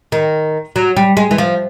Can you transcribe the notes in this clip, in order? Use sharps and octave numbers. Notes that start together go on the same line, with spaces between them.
D#3
F#3
G3
G#3
E3
F3